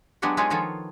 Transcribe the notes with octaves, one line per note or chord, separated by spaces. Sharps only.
F#3 G#3 B3 D4 G4 C#5
G#3 D#4 F4 G#4 B4 C#5
D#3 F3 B3 F4 A4 C#5